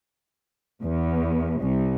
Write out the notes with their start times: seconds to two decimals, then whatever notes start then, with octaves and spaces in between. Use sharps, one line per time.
0.82 E2
1.60 C2